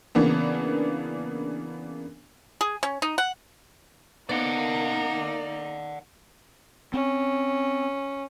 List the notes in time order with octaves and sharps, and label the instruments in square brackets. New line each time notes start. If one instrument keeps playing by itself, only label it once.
[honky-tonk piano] C#3 E3 A#3 B3 D4
[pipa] G#4
C#4
D#4
F#5
[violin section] A#3 [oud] B3 [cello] D#4 [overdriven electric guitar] D5 F#5
[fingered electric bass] C4 [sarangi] C#4